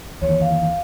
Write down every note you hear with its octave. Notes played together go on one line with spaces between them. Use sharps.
E2 D#3 C#5
F5